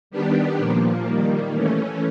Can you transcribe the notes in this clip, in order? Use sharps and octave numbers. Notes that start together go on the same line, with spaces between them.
D#3 G3 B3 D4 G4
A#2 F3 A#3
D#3 G3 A#3
E3 A3 C#4